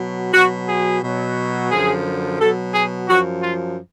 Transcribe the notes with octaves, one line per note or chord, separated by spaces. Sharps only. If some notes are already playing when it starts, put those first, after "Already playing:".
Already playing: B2 F#3
B2 F#3 F#4
G#4
B2 F#3
F#2 D3 F3 G#4
B2 F#3 A4
G#4
F#2 F3 F#4
F4